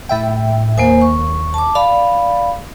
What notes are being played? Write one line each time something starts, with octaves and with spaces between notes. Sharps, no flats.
A2 E5 G5
D#2 A#3 C5 G#5
C#6
A5 D6
D5 F5 B5